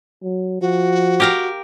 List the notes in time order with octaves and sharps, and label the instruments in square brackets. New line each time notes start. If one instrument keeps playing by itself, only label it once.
[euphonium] F#3
[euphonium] F3 [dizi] F#4
[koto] G4 A#4 F5